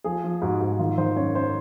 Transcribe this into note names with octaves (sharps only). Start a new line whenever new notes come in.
F3 G#4
F3
G#2 F#4
G#2
D#3 F4
D#3 C5
F#2 C#5
F#2 C5